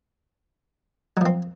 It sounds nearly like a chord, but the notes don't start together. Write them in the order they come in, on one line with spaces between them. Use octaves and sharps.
F#3 F3 C4